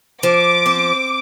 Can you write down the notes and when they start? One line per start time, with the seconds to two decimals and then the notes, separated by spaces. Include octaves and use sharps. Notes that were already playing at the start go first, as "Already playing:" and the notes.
0.23 F3 D6
0.66 C4